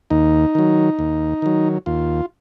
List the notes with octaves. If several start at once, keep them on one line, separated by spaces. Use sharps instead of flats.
D#2 D#4
D#3 F#3
D#2
D#3 F#3
D#2 F4